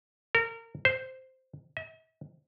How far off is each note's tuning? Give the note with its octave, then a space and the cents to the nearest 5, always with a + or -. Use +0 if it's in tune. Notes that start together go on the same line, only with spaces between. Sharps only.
A#4 -30
C5 -5
E5 -45